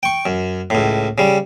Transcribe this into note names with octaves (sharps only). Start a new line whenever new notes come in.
G5 C#6
F#2
C#2 A2
C#3 G3